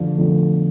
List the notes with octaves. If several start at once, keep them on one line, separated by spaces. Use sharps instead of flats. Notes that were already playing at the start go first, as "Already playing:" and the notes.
Already playing: F2 D3 F3 A3
F2 D3 F3 A3